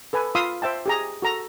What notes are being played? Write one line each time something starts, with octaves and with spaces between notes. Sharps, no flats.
A4 B4 G#5
F4 F5 B5 C6 D#6 E6
C5 E5 G5 A5
G4 G#4 A#5
F#4 A4 A#5